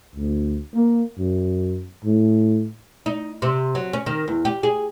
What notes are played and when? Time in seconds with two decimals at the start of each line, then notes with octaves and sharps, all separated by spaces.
0.16 D2
0.74 A#3
1.19 F#2
2.05 A2
3.06 D#4
3.42 C3
3.75 F#3
3.93 C#4
4.06 D#3
4.28 E2
4.45 G4
4.63 G#4